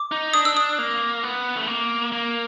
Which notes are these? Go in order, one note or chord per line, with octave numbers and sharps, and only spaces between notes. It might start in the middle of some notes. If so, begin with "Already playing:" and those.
Already playing: D6
D#4
D4 D#6
E6
D#6
A#3
B3
A3
A#3
A#3